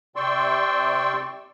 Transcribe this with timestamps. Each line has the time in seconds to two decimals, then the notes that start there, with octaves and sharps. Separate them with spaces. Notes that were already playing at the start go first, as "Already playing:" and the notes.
0.16 C3 D5 G5 C6 C#6 E6